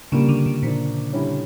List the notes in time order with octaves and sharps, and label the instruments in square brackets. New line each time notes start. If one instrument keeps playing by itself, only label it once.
[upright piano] A#2 G3 A#3 D4 [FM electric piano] C#3
[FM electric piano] D3
C#3
[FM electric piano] A#2 [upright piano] F3 A#3 D4
[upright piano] D3 G3 C#4 E4